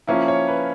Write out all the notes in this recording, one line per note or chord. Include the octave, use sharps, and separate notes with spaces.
F3 A#3 C#4 E4
C#5
B4